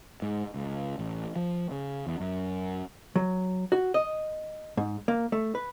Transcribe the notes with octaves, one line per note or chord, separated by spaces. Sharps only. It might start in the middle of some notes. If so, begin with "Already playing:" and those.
G#2
C#2
A1
F3
C#3
E2
F#2
F#3
F#4
D#5
G#2
A#3
A3
B4